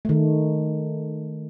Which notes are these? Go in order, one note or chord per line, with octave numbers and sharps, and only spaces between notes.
D#3 A3